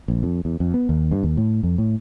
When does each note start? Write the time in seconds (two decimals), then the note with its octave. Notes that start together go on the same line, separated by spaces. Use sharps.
0.08 A#1
0.23 F2
0.45 E2
0.60 F2
0.74 B3
0.89 D#2
1.11 G2
1.23 D#2
1.37 A2
1.63 F2
1.78 A2